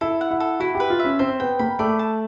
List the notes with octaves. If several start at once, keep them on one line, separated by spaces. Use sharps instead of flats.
E4 A4
F#5
E4
A4
E4 F#4
G4
B4
F4
E5
C#4
C4 C5
B3 G5
A#3 B5
A3 D5
A5